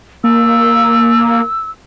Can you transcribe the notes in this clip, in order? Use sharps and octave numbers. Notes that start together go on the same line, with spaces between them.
A#3 E6